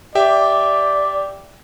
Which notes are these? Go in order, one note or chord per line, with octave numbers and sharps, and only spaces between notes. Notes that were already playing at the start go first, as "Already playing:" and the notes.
G4 D5 E5 G5